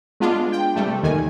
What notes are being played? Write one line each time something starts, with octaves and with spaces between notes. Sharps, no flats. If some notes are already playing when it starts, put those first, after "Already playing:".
G#3 B3 D4 F4
G5
C3 G3 A3
D#2 D#3 G#5